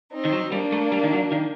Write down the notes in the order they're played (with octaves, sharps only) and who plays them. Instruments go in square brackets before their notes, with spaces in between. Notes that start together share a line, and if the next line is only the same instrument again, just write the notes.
[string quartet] C4 D#4
[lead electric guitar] D#3
F#3
[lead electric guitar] G3 [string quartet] A#3 D4
[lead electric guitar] A3
G3
D#3
F#3
D#3